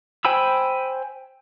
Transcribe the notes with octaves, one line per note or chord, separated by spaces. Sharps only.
C5 G5 G#5 B5 E6